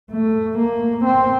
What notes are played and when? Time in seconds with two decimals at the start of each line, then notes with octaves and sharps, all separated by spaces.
0.11 A3
0.58 A#3
1.05 C4